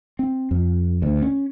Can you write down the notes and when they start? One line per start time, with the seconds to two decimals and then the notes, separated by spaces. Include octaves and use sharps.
0.19 C4
0.51 F2
1.02 D2
1.22 C#4